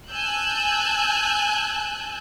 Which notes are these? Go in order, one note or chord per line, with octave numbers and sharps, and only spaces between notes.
G#5 A5 E6 F#6 G6